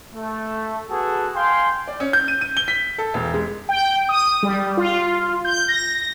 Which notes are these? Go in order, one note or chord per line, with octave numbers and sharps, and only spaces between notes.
A3
B3 F#4 G#4 A4 F#5
F5 G5 G#5 C6
D5
C#4
G6
D#7
D#7
G7
B6
A4
E1
G#3
G5
D#6
G3
F4
G6
A#6